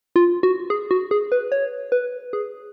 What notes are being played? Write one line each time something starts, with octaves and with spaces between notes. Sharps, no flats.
F4
F#4
G#4
F#4
G#4
B4
C#5
B4
G#4